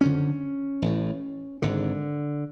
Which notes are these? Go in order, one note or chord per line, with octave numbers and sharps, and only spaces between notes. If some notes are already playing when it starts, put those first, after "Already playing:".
F#1 F2 D3 C#4
A1 A2
G#1 G#2 D3